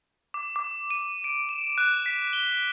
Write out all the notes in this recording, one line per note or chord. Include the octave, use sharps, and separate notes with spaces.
D6
D6
D#7
D7
E7
F#6
B6
G7